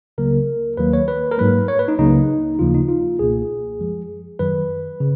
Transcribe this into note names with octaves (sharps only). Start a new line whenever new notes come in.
C#2 C#3 F#3 A#3 A#4
D#2 D#3 F#3 A#3 B4
C#5
B4
A#4
G#2 F#3 A#3 B4
C#5
B4
D#4
C#2 C#3 F#3 A#3 D#4
D#2 C#3 F3 A#3 F4
D#4
F4
C#2 B2 A#3 G#4
F#2 F3 G#3
F#2 D#3 F#3 B4
C#3